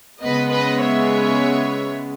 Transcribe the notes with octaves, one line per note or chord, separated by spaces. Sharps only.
C#3 G#3 B3 B4 D#5
B4 D#5
C#5 E5